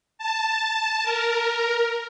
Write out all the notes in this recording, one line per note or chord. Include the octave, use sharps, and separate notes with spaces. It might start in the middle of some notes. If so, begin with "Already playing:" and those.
A5
A#4